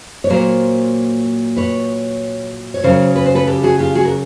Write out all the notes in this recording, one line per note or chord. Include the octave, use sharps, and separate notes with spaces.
C#5
A#2 F#3 A#4 C5
B4 C#5
C#5
C#3 F#3 A#4 C5
B4
C5
A4 B4
G4 A4
F#4 G#4
F4 G4
F#4 G#4
A#4